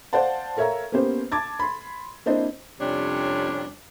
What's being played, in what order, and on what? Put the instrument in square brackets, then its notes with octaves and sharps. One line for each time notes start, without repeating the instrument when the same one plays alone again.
[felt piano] C5 D5 F5 F#5 A5
A4 A#4 C#5 E5 F5 A#5
A#3 B3 C#4 G4 C5
A5 D6 G#6 A6
B5 C6
A#3 C4 D4 E4 C5 D#5
[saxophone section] F2 C3 G3 C#4 D4 C#5